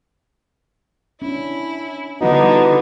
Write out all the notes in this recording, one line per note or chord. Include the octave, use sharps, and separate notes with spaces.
C#4 D4 E4
D3 G3 B3 D#4 E4 F#4